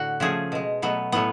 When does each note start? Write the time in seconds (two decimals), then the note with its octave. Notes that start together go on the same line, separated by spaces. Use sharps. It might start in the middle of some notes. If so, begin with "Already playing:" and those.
Already playing: A2 D3 F#4
0.20 C#3 F3 A3 G#4
0.52 B2 G#3
0.82 B2 F#3 A3 B3
1.12 A2 F#3 A3 B3